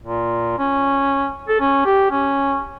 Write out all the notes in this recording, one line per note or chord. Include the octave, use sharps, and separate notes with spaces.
A#2
C#4
A4
C#4
G4
C#4